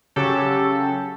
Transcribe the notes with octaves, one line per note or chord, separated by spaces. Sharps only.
C#3 F#3 C#4 G4 A4